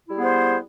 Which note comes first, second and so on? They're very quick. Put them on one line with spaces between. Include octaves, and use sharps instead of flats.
E4 G3 G#4 B3 C5